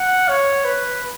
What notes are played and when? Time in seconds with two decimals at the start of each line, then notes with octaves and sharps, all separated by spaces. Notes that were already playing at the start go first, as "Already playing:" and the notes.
Already playing: F#5
0.28 C#5
0.65 B4